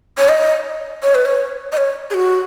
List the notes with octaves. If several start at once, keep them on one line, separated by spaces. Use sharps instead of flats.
C#5
D#5
C#5
B4
C#5
D#5
C#5
G#4
F#4